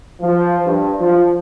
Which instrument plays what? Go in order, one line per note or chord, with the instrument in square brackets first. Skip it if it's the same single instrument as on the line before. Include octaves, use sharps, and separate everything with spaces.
[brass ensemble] F3
G2
F3